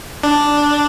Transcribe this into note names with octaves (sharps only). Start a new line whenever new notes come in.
D4